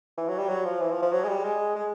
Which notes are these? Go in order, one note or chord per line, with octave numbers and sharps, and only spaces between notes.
E3
F#3
G3
F#3
F3
E3
F3
F3
F#3
G#3
G3
G#3
G#3